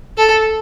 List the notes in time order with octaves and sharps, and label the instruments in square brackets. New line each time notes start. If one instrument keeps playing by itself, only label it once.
[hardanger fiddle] A4